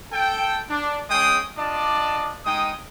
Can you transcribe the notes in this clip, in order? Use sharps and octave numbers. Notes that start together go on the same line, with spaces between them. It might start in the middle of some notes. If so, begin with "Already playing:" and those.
A4 G5
D4
G#3 C#4 G#4 G5 D#6
D4 F4 D5 D#5 A5
G#3 D#4 G5 D#6